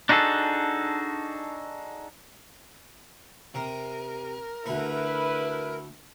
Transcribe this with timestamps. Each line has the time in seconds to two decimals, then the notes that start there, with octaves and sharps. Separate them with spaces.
0.09 D4 D#4 F#4 G#4 A4
3.55 C3 A#4
4.66 D2 A3 E4 B4